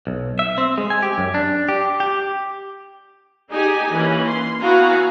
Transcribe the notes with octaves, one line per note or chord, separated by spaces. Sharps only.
B1
E5
C4
G#3
G#5
G4
F#2
D4
G4
G4
D#4 G4 G#4 G#5
E3 A#3 C#4
C6
B3 E4 F#4 F5 G#5 A#5